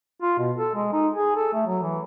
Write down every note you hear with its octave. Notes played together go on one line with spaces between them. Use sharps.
F4
B2
A4
G#3
D#4
G#4
A4
A3
F#3
E3